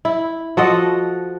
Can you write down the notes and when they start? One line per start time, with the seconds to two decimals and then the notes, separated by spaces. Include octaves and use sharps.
0.05 E4
0.57 F3 F#4 A4 D#5